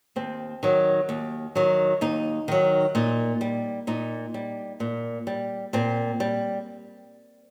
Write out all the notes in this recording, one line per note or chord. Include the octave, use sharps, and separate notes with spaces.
D#2 C4
D#3 F#3
D#2
D#3 F#3
D#2 D#4
D#3 F#3
A#2 D#4
G3
A#2 D#4
G3
A#2
G3
A#2 C4
G3